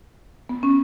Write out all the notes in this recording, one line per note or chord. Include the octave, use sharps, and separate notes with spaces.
B3
C#4